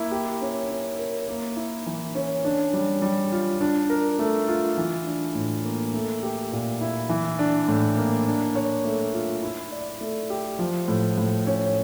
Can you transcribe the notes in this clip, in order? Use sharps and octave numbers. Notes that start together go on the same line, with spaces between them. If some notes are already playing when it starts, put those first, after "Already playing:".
Already playing: A#3 E4
G4
C#4
C#4
A#4
A#3
E4
E3
C#4
D4
G3
G3
F4
D4
A#4
A3
F4
E3
D4
A2
A#3
A3
G4
A#2
E4
E3
D4
A2
A#3
D4
C#5
A3
F4
E4
D5
A3
G4
F3
A2
A2
C#4